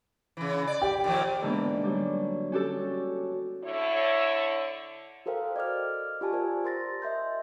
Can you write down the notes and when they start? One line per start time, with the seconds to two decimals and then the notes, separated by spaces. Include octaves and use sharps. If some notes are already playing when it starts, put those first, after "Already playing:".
0.37 C#3 E3
0.67 D5
0.82 G4
1.04 A#2 D#3 F3
1.42 G#2 D3 E3 A#3 B3 D4
1.84 F#3 G3
2.52 C#4 F#4 G4 A4
3.64 D3 E4 C#5
5.26 F#4 A4 A#4 C5 F5 G5
5.56 D5 D#5 D6 F6
6.21 F4 G4 G#5 A5
6.32 F4 G4 A#4 C5 D5
6.64 A#4 C6 A6 A#6
7.02 D#5 E5 C6 G6